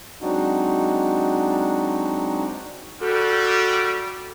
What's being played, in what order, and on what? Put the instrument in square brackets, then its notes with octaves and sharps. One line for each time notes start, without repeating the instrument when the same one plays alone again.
[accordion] F#3 G#3 C4 D4 D#4 F#4
[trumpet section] G3 [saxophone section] F#4 A4